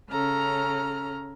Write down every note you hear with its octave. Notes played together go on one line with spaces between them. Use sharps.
C#3 C#4 A4 A#5 F6